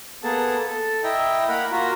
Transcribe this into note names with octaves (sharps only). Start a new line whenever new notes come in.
A#3 B3 G#4 A4 A5
A4
E4 D#5 E5 G5 A#5
A#3 A#4 F#5 B5
A#3 F4 F#4 A#5